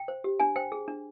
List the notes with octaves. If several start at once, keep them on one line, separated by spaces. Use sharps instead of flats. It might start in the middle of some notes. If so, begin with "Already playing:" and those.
Already playing: G5
C5
G4
D4 G#5
C5 G5
G#4
D4